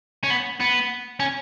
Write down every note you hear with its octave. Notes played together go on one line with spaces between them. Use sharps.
C#4
B3
B3
C#4